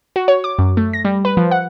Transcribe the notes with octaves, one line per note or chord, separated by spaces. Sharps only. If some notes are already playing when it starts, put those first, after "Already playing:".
F#4
C#5
D6
F#2
A3
A#6
G3
B4
F3
F#5